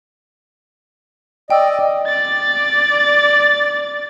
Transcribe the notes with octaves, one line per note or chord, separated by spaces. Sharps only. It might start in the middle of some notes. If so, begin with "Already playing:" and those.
D5 D#5 G5 E6
D5 A6